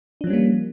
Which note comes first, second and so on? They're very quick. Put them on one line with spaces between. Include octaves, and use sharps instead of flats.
D4 F3 C#4 G3 A#3